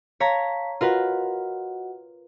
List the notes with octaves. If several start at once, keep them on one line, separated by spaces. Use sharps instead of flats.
C#5 F5 A5 A#5 B6
F4 F#4 A#4 B4 D#5 F#5